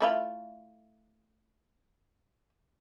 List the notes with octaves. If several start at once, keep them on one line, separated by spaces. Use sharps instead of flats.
A3 E4 F4